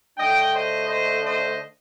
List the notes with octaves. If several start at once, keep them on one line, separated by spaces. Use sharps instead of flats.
D3 A3 D4 D#5 G5
C5 D#5
C5 D#5
C5 D#5